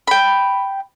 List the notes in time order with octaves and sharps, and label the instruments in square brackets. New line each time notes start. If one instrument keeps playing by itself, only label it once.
[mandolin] G5 B5